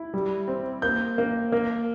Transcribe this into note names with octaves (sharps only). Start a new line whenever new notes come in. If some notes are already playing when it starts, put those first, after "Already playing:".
Already playing: E4
G3
C4
A#3 G6
A#3
A#3